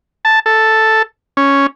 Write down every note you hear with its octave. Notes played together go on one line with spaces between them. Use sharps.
A5
A4
C#4